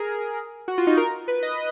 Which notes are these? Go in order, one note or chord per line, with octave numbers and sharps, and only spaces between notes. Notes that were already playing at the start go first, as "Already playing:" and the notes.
Already playing: G#4 A#4
F#4
F4
D#4
A#4
B4
D#5